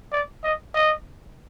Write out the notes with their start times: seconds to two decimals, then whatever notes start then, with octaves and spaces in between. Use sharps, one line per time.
0.12 D5
0.43 D#5
0.74 D#5